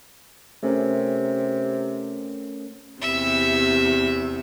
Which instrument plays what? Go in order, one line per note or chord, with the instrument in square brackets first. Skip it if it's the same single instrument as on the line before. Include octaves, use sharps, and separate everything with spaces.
[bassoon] C3 [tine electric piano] A3 C#4 A#4
[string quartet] E2 C3 [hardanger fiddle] E5